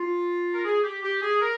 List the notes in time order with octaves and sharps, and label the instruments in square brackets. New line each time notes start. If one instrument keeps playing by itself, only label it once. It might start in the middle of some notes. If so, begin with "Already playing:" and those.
Already playing: [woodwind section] F4
A#4
G#4
G4
G4
G#4
A#4